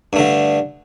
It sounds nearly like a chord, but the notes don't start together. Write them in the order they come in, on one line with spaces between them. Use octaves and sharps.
G2 A3 D3